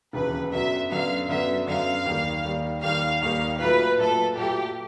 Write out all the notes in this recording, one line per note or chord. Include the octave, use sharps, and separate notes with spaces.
E1 D#2 C#3 E3 B4
F#2 D3 F#3 B3 E5
F#2 D3 F#3 B3 F5
F#2 D3 F#3 B3 E5
F#2 D3 F#3 B3 F5
D#2 D#3 G3 A#3
D#2 D#3 G3 A#3
D#2 D#3 G3 A#3 F5
D#2 D#3 G3 A#3 F5
A#2 F#3 A3 B4
A#2 F#3 A3 A4
A#2 F#3 A3 G4